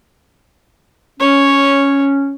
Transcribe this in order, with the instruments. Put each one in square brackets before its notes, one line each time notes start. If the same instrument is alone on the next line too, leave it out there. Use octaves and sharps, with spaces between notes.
[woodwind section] C#4 [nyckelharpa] C#5